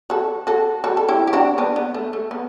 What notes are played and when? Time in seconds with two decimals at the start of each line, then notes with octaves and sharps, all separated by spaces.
0.10 F#4 A4
0.47 F#4 A4
0.84 F#4 A4
0.97 A4
1.09 E4 G4
1.27 G4
1.33 D4 F#4
1.58 B3 D4
1.76 B3
1.94 A3
2.13 A3
2.31 B3